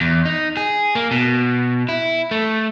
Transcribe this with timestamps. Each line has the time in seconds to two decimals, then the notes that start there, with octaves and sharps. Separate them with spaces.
0.01 E2
0.25 D#4
0.57 G#4
0.95 A#3
1.11 B2
1.89 E4
2.31 A3